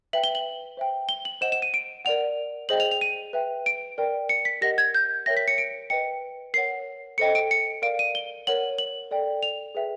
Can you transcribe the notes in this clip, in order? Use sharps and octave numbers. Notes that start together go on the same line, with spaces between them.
B4 E5 G5 F#7
G7
F#7
C5 E5 G5
G7
F#7
C5 D#5 F#5 E7
E7
D#7
D7
A#4 D5 F#5 F7
G#4 C5 D#5 G5 F#7
F7
F7
D#7
B4 E5 G5
D7
A#4 D5 G5
C#7
B6
G4 A#4 D#5 F#5 A#6
G#6
G6
A#4 C#5 E5 G5 A#6
B6
C#7
D7
B4 D#5 G5 C#7
A#4 C#5 F#5 C7
A4 C5 D#5 G5 C#7
D7
C#7
A#4 D5 F5 D7
D#7
G7
A#4 C#5 F#5 F#7
F#7
A4 D5 G5
F7
G#4 B4 E5 G5